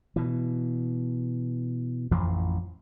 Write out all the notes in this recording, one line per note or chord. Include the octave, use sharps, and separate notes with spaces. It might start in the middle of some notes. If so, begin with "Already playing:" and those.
B2 E3
A1 F2 E3 F3